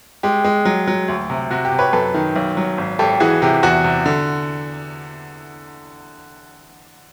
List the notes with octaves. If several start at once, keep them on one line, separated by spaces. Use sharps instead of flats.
G#3 G4
G#3
F#3
F#3
D2
C3
C3 F#4
G4
C3
B4 C#5
F#2 A4 B4
D#3
B1
F#3
G#1
G#1 G4 A4
E3 F#4 G#4
C3 G4
E2 F#4
C3
D3